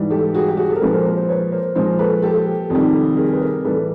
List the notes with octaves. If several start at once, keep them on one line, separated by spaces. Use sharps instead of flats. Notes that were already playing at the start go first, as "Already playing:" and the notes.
Already playing: G#2 E3 G3
G4 A4
F#4 G#4
G4
F#4 G#4
G4 A4
A#4
A#2 F3 G#3 A4 B4
A#4 C5
A#4 C5
A#4 C5
B4 C#5
A#4 C5
A#2 F3 G#3 A#4 C5
A4 B4
G4 A4
F2 C3 D#3 G3
G#4 A#4
B4
G#4 A#4
A2 E3 G3 A4 B4